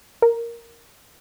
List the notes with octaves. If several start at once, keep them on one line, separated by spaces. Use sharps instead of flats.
A#4